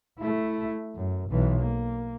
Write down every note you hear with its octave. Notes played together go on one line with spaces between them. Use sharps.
A3 E4
F#2
B1 E3
A#3